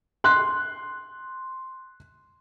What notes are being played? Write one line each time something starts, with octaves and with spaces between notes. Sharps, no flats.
C6 F#6